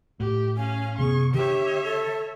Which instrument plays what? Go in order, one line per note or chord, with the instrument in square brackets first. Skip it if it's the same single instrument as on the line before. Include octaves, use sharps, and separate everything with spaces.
[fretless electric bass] A2 [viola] G4
[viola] C#4 F5 [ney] G#5
[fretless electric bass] F#2 C3 B3 [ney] G#4 [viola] C#6
[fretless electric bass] D3 [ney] G4 [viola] C#5 E5
[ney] A4